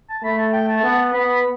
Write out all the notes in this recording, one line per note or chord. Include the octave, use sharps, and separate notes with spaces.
A5
A3 B5
A5
G5
A5
B3
B3 B5
B5